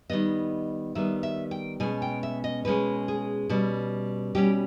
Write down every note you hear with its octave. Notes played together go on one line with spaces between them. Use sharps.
D#3 G3 B3 D#5
D#3 G3 B3 E5
E5
G5
B2 G#3 C#4 G#5
G5
E5
D#5
B2 G#3 C#4 B4
G#4
B2 G3 C#4
B2 G3 C#4 G4